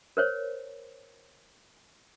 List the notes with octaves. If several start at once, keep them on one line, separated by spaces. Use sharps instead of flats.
A#4 C5 C#5